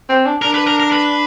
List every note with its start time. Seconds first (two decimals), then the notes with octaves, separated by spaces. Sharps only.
0.09 C4
0.26 D4
0.42 D4 A#4
0.54 B4
0.67 A#4
0.80 A#4
0.92 B4